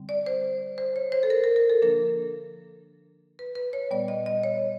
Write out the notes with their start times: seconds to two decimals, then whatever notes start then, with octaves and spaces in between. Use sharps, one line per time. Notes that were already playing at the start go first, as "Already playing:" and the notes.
Already playing: D3 G3 C4
0.09 D5
0.26 C5
0.78 C5
0.96 C#5
1.12 C5
1.23 A4
1.30 A#4
1.44 A#4
1.56 A#4
1.70 A4
1.82 D3 F3 A#3 D4 A#4
3.39 B4
3.56 B4
3.73 C#5
3.91 A#2 G3 B3 D5
4.08 D#5
4.26 D#5
4.44 C#5